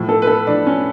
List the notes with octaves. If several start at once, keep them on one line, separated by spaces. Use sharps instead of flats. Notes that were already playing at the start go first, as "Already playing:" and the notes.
Already playing: A2 F3
A4
B4
A4
A2 F3 D4
C#4